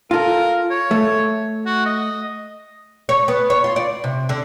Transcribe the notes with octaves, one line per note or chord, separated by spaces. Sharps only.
F4 A4 A#4
C#5
A3
F#4
D#5
C#5
B3
C#5
F4
D5
C3
D3